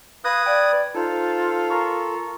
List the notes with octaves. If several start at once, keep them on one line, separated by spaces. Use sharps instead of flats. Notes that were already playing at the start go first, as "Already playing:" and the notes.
B4 F5 D#6 F#6 G#6 A#6
D5 G5 G#6
D#4 F4 A4 C5
A#4 A#5 C#6